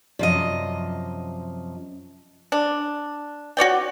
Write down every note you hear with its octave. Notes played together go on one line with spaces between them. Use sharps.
F#2 C3 F3 D5 D#5
D4
F#4 C#5 D5 G5